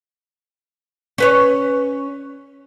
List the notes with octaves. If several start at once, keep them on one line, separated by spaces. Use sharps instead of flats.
C#4 B4 C#5